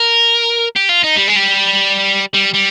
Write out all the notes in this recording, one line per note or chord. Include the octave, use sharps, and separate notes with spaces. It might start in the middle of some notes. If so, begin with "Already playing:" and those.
Already playing: A#4
G4
F4
D#4
G3
G#3
G3
G3
G3